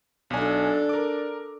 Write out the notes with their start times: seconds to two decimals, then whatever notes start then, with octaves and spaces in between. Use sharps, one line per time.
0.30 B1 D4 A4 G#5
0.89 A#4 D6